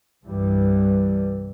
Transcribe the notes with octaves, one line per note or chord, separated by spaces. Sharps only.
C2 G2 E3 G3